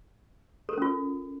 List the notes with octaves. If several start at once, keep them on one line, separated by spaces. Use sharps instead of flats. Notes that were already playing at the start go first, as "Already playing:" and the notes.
C#4 F4 A4 A#4